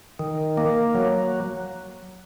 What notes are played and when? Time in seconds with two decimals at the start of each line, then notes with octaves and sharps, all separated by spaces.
0.19 D#3
0.57 A#3
0.95 F#3